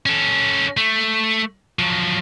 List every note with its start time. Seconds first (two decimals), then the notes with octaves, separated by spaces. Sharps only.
0.06 C#4 A4
0.77 A3
1.79 F3 F#3